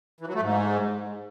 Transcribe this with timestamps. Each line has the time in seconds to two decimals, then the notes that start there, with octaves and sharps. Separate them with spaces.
0.20 E3
0.27 F#3
0.34 A3
0.41 G#2